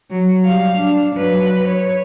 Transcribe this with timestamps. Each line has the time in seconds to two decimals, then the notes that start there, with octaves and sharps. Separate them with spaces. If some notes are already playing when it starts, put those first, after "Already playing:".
0.11 F#3
0.45 G3 F5
0.78 D4
1.16 F#3 B4
1.69 C#5